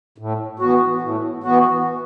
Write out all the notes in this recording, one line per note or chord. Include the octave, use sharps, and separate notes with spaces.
A2
E3 B3 F#4
A2
E3 B3 F#4